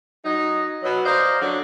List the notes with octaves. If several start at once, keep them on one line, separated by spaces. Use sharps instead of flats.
F#3 D#4
B2 F#3
A#4 C5 D5 D#5 F5
D3 F#3